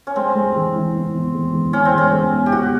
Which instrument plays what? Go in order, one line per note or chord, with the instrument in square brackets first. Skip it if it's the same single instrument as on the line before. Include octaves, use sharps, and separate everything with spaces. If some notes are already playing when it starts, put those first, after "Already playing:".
[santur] C#4
[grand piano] G#3 [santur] C4
[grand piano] G#3
E3
E4
B3
E3
G#3
E3
[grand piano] E3 [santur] C#4
[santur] C4
[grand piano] G#3
[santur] C#4
[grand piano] B3
E4
[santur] G4
[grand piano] B3 [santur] F#4